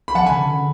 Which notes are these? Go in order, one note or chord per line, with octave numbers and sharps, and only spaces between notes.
B5
F3 F#5 A5
G#5 B5
D3
D3